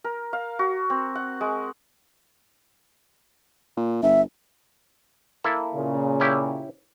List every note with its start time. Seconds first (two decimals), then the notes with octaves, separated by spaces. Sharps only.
0.04 A#4
0.33 F5
0.59 F#4
0.90 C4
1.15 F#5
1.41 G#3
3.77 A#2
4.03 G1 E5
5.44 A#3 E4 A4
5.75 A#2 C#3
6.20 C#4 E4 G4